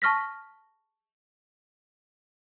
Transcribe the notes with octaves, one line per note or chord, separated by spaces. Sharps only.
A5 C#6 F6 A#6 B6